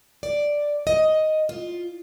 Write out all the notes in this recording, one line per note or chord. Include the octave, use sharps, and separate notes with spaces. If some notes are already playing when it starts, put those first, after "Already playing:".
D5
D#5
F4